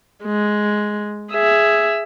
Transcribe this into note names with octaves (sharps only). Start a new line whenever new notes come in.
G#3
G#4 E5